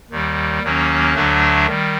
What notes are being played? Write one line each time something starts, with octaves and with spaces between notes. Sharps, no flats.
D#2 D#3 G3
D#2 D#3 F#3 A#3 C#4
D2 D3 F#3 A3 D4
D#3 G3